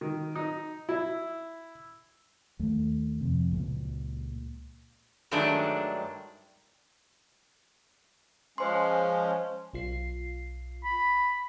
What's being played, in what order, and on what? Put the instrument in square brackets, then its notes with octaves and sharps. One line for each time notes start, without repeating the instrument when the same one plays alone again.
[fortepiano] D#3
D#4
E4
[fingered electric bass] D#2 A3
F2 C3
C#2 A#2
[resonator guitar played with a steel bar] G2 D#3 F#3 G#3 A3 D4
[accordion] F3 G#3 C#4 [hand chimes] C5 C6
[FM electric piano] B1 F4 C7
[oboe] B5